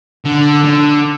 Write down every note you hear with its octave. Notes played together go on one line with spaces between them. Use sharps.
D3
D3